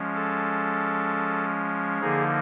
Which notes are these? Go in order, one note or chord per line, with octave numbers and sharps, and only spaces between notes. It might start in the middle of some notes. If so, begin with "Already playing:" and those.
Already playing: F3 G#3 C#4
A4
D3 F3 A#3 D#4 G#4